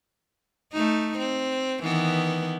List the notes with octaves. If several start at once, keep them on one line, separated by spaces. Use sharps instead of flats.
A3 D#4
C4
D#3 E3 B3